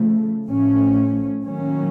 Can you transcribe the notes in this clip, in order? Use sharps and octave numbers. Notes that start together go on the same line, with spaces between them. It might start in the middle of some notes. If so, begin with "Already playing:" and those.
Already playing: C#3 F3 A3
A2 F3 A3 C#4
D#3 F#3 A#3 C#4